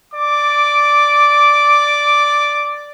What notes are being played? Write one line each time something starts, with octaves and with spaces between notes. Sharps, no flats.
D5 D6